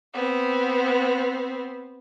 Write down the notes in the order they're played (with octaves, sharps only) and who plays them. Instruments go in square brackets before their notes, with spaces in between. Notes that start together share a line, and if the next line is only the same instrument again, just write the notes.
[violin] B3 C4